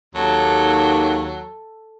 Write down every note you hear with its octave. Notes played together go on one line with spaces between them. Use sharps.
D#2 F#3 A4